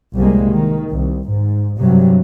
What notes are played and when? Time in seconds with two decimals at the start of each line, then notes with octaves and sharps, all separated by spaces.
0.15 C2 G3 G#3 A#3
0.51 D#3
0.90 C2
1.28 G#2
1.78 G2 C3 F#3